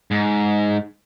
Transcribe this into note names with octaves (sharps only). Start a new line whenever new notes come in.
G#2